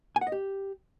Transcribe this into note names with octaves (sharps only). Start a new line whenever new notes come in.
G#5
F#5
D#5
G4